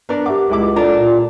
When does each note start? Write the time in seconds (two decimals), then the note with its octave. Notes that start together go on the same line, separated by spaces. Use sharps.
0.09 B3 D4 A#4
0.26 G4 E5 F#5 D6
0.50 C#2 G#3 E4 D6
0.76 D4 F4 A4 A#4 D5 A#5
0.97 A#2